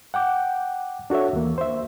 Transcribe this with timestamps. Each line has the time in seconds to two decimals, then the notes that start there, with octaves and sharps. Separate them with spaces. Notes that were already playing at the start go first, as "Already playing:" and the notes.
0.14 F#5 G5 D6 G6
1.10 D4 F#4 A4 C#5 E5
1.33 D#2 E3 A#3
1.58 C5 E5